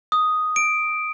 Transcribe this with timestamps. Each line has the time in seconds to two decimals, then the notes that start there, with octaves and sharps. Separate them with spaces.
0.12 D#6
0.56 D7